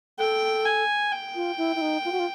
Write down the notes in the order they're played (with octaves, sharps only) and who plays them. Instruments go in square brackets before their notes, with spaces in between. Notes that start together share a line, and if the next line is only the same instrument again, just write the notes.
[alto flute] A4 [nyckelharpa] G5
[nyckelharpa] G#5
G5
[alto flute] F4
E4
E4
D#4
F4
F#4
F4